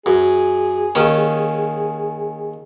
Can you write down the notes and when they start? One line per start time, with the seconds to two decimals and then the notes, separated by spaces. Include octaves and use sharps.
0.06 F#2 G#4
0.95 D#2 D#3 C#4